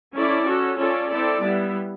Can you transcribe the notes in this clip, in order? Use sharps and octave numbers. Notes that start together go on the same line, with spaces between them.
C#4 E4 A4 D5
C#4 F#4 A4
C#4 F4 A4 D5
C4 E4 A4 D5
G3 B3 E4